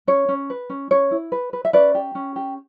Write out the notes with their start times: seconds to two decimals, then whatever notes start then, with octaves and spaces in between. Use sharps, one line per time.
0.07 C#4 C#5
0.29 C#4
0.50 B4
0.70 C#4
0.91 C#4 C#5
1.11 E4
1.32 B4
1.53 B4
1.65 E5
1.73 C#4 B4 D5
1.95 G4
2.15 C#4
2.36 G4